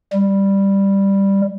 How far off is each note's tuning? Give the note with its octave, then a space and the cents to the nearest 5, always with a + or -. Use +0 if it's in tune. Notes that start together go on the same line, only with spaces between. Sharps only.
G3 +5